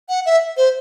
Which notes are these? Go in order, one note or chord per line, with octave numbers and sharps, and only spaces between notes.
F#5
E5
C5